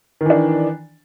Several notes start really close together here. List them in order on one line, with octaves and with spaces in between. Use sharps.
D#3 E3 D4